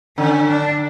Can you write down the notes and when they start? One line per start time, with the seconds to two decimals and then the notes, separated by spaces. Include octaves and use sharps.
0.18 D3 C#4
0.49 D4